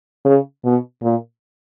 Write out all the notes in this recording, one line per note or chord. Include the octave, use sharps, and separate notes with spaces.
C#3
B2
A#2